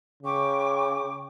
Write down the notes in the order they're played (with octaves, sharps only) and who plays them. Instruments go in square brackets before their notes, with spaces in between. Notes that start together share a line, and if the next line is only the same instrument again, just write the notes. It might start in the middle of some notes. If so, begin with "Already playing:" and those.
[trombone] C#3 [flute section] G5 C#6 D6